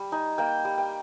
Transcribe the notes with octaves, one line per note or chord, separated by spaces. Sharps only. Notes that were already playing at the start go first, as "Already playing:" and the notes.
Already playing: G3
D#4 G#5
A#3 G5
G3
G5